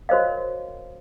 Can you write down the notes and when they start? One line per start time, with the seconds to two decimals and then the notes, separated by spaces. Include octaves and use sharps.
0.09 F#4 A#4 C5 C#5 D#5 F5